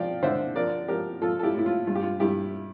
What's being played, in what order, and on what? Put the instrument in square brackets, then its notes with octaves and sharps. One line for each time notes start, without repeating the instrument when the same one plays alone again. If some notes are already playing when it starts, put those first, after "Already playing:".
Already playing: [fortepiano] F3 D5 F5 G5
D3 C5 E5
F3 A#4 D5
F3 G4 A#4
F3 F4 A4
A4
E4 G4
A2 E4
F4
G2 F4
G4
F4
G2 E4 G4